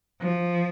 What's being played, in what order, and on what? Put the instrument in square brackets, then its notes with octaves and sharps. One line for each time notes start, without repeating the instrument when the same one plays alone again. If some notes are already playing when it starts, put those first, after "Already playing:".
[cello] F3